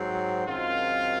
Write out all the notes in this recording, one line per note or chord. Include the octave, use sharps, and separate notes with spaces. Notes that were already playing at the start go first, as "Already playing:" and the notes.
Already playing: G#2 F#3 C4
F#2 D#3 G#3 C4 F4